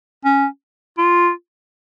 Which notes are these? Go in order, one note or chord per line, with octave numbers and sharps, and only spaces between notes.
C#4
F4